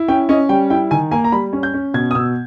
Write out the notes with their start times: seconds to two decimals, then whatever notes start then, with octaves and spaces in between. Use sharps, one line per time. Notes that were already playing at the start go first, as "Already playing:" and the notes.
Already playing: E4
0.08 C#4 G5
0.29 C#4 D#5
0.49 G3 G5
0.70 E4 G5
0.91 D#3 G#5
1.11 A#3 G#5
1.24 A#5
1.32 G3 B5
1.53 C#4
1.63 G6
1.74 C#4
1.94 B2 G#6
2.11 D#6
2.15 B2 E6